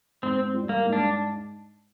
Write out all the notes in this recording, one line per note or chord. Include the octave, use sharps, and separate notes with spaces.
G#2 C4
G3
A#3
G#2
D4